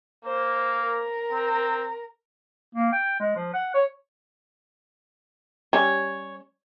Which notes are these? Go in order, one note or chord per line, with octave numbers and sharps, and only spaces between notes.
A#3 C5
A#4
C4
A#3
G5
G#3
F3
F#5
C#5
G3 C#4 C#5